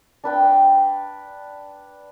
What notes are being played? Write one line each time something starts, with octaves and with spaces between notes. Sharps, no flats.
D4 B4 G5